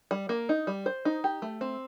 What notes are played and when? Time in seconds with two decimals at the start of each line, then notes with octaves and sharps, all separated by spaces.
0.11 G3
0.29 A#3
0.49 D#4
0.67 G3
0.86 C5
1.05 D#4
1.24 G4
1.42 A3
1.61 C4